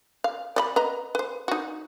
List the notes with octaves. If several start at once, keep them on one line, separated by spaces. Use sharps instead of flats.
F5
D5 D#5 B5
B4 D#5 A#5
B4 C5
D#4 F#4